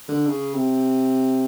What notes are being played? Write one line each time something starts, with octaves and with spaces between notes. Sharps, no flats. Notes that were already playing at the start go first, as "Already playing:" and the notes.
D3
C#3
C3